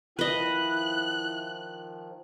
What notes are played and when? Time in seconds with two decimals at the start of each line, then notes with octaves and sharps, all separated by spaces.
0.19 D#3 F3 E4 B4 D#5 F#6